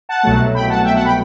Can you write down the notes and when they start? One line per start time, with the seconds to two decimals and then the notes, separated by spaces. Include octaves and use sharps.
0.09 F#5 A5
0.23 C2 B2 F#3 A3
0.55 G5 B5
0.70 F#5 A5
0.84 E5 G5
0.95 F#5 A5
1.05 G5 B5